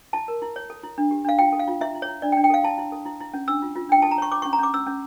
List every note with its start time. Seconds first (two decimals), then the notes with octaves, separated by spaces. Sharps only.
0.13 E4 A5
0.28 A#4
0.42 E4
0.56 C#5
0.70 A4
0.83 E4
0.98 D4
1.11 G4
1.25 D4 F5
1.39 F4 G5
1.53 A4
1.59 F5
1.67 F4
1.81 E4 E5
1.95 E4
2.02 C#5
2.08 E4
2.22 D4 D5
2.32 G5
2.37 D4
2.44 G5
2.50 A4 F5
2.64 E4 A5
2.78 E4
2.92 A4
3.05 E4
3.21 E4
3.34 C#4
3.48 D4 E6
3.62 F4
3.76 F4
3.89 D4 G5
4.02 A4 A5
4.11 A#5
4.18 C#5 C#6
4.32 C#5 D6
4.42 C#4 C#6
4.53 A#5
4.59 C#4 D6
4.74 C#4 E6
4.87 C#4